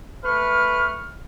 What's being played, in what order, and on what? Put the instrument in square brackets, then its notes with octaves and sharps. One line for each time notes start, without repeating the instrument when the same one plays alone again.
[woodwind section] A3 C#6 F6 [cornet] B4